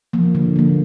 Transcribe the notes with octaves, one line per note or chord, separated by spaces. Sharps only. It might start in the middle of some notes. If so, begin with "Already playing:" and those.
F3 A#3
D3
F3 A#3